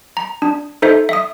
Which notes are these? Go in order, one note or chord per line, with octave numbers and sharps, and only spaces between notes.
A#5
D4
D#4 A4 C5 E5
E5 D#6